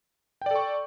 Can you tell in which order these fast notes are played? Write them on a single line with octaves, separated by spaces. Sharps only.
G5 D5 A4 C#6